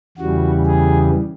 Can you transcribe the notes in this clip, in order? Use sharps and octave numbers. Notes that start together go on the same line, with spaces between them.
E2 C#3 E3 G3 F#4
G#4